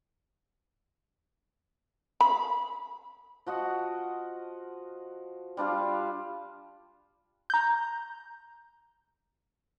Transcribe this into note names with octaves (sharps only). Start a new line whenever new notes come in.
B5
F3 F#4 D#5 F#5
G3 D4 F4 F5
A#5 G6